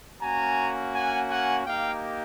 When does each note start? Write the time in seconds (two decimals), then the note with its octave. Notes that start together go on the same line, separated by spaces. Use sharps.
0.20 A#3 C#4 F#4 G#5 A#5
0.94 F#5 G#5
1.30 F#5 G#5
1.66 A#3 D#4 G4 F5 G5